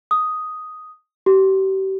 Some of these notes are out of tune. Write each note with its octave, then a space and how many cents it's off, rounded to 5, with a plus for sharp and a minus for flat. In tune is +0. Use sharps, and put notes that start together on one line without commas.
D#6 +5
G4 -35